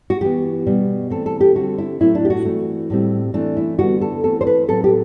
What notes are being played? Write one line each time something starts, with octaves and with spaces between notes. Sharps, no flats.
F#4
E3 B3 G4
B2 G3 B3
E3 A3 C4 A4
A4
G4
D3 G3 C4 F#4
E4
A2 F#3 A3 C4 E4
D4
G4
F#4
E3 A3 C4
A2 G3 C4
E3 A3 C4 D4
E4
D3 G3 B3 F#4
A4
E3 A3 C4 A4
C5
B4
A2 F#3 C4 A4
G4